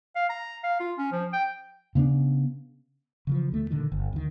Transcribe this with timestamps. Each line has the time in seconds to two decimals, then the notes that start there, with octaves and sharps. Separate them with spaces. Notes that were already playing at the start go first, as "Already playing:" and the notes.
0.16 F5
0.29 A#5
0.64 F5
0.80 F4
0.98 C#4
1.12 F3
1.33 G5
1.95 C#3 B3 C#4 D4
3.27 C#3 E3 F3
3.52 D2 A3
3.71 A#2 D3 D#3
3.92 G1
4.13 D2 D#3